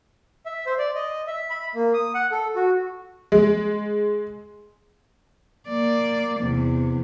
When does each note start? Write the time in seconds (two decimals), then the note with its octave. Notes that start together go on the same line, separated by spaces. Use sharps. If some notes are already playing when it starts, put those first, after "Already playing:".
0.46 E5
0.66 C5
0.78 D5
0.95 D#5
1.27 E5
1.50 B5
1.75 A#3
1.94 D#6
2.15 F#5
2.31 A4
2.56 F#4
3.32 G#3
5.69 A#3 D5
6.41 E2 C3